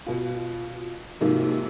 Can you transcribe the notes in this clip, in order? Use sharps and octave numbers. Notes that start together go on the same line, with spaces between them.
B2 F4
G#2 C3 D#3 F3 F#3 A#3